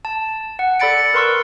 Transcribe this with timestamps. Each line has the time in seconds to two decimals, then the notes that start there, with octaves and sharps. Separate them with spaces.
0.05 A5
0.59 F#5
0.80 A4 D5 B5 A6 C#7 D7
1.14 A#4 B4 C6 C#6 E6